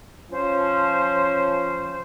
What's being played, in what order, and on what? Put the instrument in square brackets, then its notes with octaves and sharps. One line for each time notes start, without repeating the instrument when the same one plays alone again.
[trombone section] F3 C#4 [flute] C5